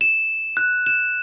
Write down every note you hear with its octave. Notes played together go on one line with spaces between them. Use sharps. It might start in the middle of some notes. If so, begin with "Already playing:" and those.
E7
F#6
E7